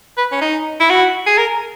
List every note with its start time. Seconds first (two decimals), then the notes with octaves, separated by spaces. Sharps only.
0.17 B4
0.32 C#4
0.41 D#4
0.80 E4
0.90 F#4
1.26 G#4
1.38 A#4